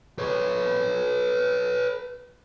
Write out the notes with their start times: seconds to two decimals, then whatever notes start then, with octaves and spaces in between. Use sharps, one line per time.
0.19 B4 C#5